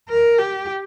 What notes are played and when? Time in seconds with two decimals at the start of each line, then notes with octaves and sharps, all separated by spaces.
0.09 A#4
0.38 G4